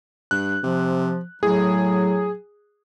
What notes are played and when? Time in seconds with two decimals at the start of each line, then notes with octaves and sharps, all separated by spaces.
0.31 G2 F#6
0.63 C3 F3
1.43 A2 F#3 G#4